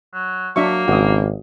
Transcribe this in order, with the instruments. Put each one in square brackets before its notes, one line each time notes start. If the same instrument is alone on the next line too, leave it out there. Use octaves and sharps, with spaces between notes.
[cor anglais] F#3
[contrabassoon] F#3 [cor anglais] A#3 [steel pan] D4 E5 C#6
[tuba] G#1 [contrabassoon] C#2 [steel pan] F#4 D#6